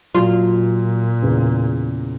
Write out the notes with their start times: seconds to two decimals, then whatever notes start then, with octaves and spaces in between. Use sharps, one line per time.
0.15 A#2 F#3 F4
1.23 E2 C#3